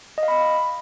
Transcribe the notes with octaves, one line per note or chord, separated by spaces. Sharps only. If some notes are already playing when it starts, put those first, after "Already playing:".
D#5
F5
B5